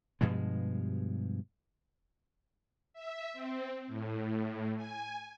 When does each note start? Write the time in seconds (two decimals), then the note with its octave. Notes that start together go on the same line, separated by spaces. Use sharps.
0.21 G2 B2 F3 G#3
2.94 E5
3.33 C4
3.88 A2
4.76 G#5